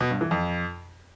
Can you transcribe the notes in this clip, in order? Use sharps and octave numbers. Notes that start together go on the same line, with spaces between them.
B2
G2
E3
F2